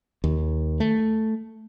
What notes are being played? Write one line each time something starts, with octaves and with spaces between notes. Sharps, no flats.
D#2
A3